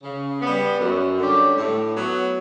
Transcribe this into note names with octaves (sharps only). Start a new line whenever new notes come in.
C#3
G3 B3
F#2
D3 G3 C#4 G4
A2
F#3 B3